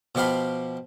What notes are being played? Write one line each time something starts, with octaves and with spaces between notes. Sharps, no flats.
B2 F3 G4 F5 B5